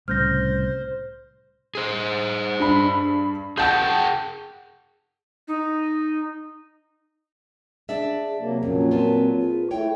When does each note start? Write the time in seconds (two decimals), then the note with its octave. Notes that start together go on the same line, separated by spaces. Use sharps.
0.08 C2 A2 C#3 C5 F6 G6 A#6
1.75 G#4 C5
2.60 G2 B5
3.58 G#4 F#5 G5 A5 G6
5.48 D#4
7.89 D4 G#4 D5 E5
8.39 C3 F#3 A#3
8.63 F2 A#2 F#3 C#4
8.91 C4 F4 B4 A5
9.41 G#4
9.71 A3 E4 C#5 G5